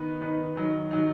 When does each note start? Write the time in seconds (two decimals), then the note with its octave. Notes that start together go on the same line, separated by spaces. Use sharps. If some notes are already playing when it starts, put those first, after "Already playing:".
Already playing: D#3 B3 D#4 B4
0.21 D#3 B3 D#4 B4
0.56 D#3 F#3 D#4
0.91 D#3 F#3 D#4